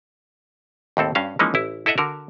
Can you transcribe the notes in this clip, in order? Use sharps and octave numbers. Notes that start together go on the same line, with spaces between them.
D#2 A2 C4 A4
G2 C#4 F#4 F5
E3 F3 G#3 A#3 C#4 D#4
A1 E4
E4 A4 D#5 E5 F#5
D3 F#4 A#4